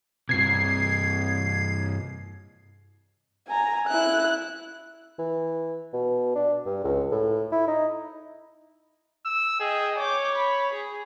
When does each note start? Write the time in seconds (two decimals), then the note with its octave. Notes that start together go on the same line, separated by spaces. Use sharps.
0.29 G2 C3 G#6 C7
3.48 G#5 A#5
3.88 E4 F#6
5.19 E3
5.93 B2
6.36 D4
6.66 G2
6.84 C#2
7.12 A2
7.52 E4
7.67 D#4
9.26 E6
9.60 G#4 D#5 G5
9.98 C#5 D6 G6
10.35 B5
10.73 G#4